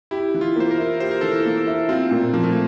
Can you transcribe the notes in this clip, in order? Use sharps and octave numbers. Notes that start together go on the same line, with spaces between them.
E4 G4
E3
F4
A#3 C5
A#4
E4
G4 C5
A#4
E3 A4
A#4
A#3
E4
C4 F4
A#2
F3 A#3
A3
A#3